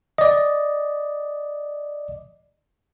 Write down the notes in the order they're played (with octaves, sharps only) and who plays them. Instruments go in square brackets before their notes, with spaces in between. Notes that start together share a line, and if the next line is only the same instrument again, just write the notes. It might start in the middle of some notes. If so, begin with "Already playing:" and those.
[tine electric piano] D5 D#5